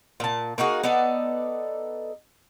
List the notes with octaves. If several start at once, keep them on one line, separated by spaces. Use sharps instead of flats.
A#2 A5
A#3 D#4 F#4 G#4
B3 D#4 A4 D5